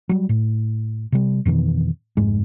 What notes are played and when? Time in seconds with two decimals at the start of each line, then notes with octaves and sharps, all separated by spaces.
0.09 F#3 G3
0.29 A2
1.12 C3 G3
1.45 F2 B2 D#3 E3
2.17 F1 G#2 G#3